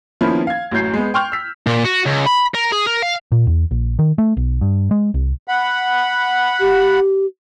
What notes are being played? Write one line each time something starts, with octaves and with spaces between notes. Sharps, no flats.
D#3 F3 A#3 B3 C#4 E4
F5 G#6
A1 F#2 A2 F#3 G6 C7
G#3 B3
G5 C6 C#6 F6 G6 F7
E6 B6
A#2
F#4
C#2
B5
A#4
G#4
A#4
F5
A#2
E2
A#1
D#3
A3
B1
G2
G#3
C2
F#5 B5
G4